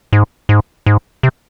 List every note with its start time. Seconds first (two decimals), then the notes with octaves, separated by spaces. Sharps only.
0.13 G#2
0.49 G#2
0.86 G#2
1.23 C3